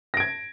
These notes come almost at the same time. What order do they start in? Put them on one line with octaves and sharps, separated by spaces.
A#6 D7 G#6